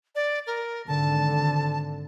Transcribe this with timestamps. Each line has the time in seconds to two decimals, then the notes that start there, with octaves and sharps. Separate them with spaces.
0.15 D5
0.47 A#4
0.87 G#1 D3 A5